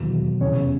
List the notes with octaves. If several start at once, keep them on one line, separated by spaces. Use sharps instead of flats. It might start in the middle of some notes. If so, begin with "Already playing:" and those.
Already playing: E1 D#2 D#3 F#3
F1 E2 C#3 C#4 C#5